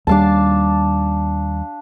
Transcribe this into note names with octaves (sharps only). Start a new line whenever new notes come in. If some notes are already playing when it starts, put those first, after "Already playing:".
D#2 G3 D4 F5 A5